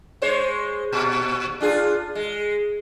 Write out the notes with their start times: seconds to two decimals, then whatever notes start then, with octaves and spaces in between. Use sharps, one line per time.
0.22 G#3 C5 C#5
0.93 A#2
1.61 D4 F4 G#4
2.15 G#3